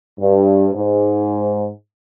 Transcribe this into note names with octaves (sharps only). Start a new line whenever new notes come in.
G2
G#2